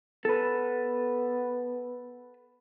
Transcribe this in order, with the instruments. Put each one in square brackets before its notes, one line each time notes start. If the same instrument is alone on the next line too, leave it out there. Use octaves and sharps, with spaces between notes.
[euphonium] B3 [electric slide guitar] A4 B4